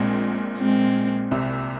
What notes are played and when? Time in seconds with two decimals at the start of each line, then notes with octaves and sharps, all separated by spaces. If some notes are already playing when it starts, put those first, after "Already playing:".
Already playing: A#1 A#2 G#3 C4
0.58 G#3 C4
1.31 C2 C3